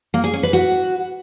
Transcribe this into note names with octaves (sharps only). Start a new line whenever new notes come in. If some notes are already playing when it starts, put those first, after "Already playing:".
A#3
G#4
C#4
B4
F#4